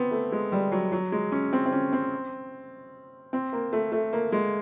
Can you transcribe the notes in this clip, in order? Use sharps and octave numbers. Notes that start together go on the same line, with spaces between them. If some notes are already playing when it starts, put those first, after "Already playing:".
Already playing: B3 C4
A3
G#3
G3
F#3
F#3
G#3
C#4
C4
C4
C#4
C4
C4
A#3
A3
A3
A#3
G#3